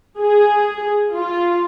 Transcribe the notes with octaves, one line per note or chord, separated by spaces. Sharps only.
G#4
F4